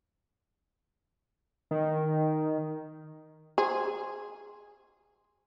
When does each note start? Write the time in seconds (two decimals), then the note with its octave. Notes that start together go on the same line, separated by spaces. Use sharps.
1.71 D#3
3.58 G#4 C5